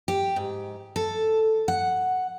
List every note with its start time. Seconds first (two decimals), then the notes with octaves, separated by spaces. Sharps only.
0.08 G4
0.36 G#2
0.96 A4
1.68 F#5